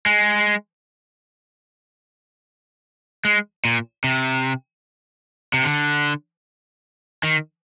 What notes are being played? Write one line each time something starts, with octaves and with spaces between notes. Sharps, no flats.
G#3
G#3
A#2
C3
C3
D3
D#3